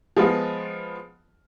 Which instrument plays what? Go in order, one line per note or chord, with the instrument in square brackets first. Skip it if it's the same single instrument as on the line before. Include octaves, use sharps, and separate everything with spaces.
[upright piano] F3 G#3 B3 F4